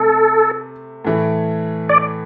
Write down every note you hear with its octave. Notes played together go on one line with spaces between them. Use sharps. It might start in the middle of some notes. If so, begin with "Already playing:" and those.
Already playing: C3 A3 A4
A2 E3 A3
D5